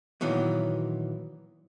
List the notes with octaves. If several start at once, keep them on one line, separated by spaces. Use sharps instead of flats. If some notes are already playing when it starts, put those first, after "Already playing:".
A#2 D#3 E3 F#3 B3